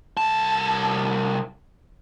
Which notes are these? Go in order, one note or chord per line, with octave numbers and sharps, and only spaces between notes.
C2 A5